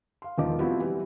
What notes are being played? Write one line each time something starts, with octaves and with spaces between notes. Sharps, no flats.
F5 C6
E1 D#3 F3 D#5 D6
F3 G3 B3 C4 E4 F#4
E3 F#3 G3